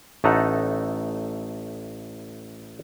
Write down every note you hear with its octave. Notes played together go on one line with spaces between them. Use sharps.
A1 A3 D#4 A4 F#5 A#5